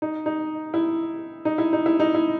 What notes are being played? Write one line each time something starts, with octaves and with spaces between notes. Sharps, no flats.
D#4
D#4
E4
D#4
E4
D#4
E4
D#4
E4